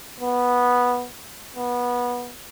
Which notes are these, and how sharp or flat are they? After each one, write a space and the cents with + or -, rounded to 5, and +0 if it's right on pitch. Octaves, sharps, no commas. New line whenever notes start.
B3 -10
B3 -20